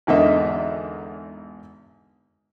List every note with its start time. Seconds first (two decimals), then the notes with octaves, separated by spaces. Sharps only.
0.07 G#1 E2 D3 D#4 A#4 E5